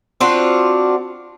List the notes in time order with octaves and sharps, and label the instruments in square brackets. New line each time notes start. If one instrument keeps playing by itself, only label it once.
[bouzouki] C4 D4 F4 F#4